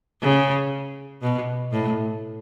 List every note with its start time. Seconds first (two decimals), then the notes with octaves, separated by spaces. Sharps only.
0.22 C#3
1.22 B2
1.72 A2